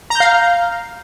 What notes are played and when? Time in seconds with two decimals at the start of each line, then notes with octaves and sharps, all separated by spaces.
0.10 A#5
0.15 G6
0.20 F5